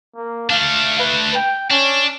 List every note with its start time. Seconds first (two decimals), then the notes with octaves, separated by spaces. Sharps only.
0.16 A#3
0.50 A3 D4 F5
0.99 B4
1.35 G5
1.71 C#4 D4